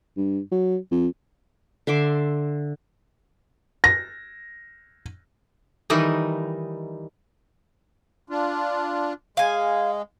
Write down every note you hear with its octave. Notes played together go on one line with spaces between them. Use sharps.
G2
F#3
F2
D3 E5 C6 D6
A#6
D#3 E3 G3 D#4
D4 F4
G#3 F5 G#5